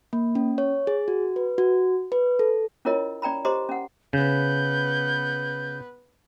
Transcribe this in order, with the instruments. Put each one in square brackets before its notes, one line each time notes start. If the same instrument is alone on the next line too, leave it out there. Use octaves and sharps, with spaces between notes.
[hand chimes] A#3
C#4
C#5
G#4
F#4
B4
F#4
B4
A4
[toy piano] C#4 E4 F4 A#4 C#5 D#5
C#4 D5 G5 A#5 B5
G4 C5 D#5 A#5 C6 D6
C#4 F#5
[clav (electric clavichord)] C#3 [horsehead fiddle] B3 B4 [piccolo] G6